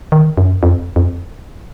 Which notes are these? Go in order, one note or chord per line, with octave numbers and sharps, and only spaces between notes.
D#3
F#2
F2
F2